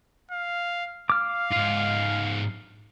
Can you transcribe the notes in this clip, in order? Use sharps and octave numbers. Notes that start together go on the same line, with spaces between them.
F5
F5 D6 F6
G#2 F4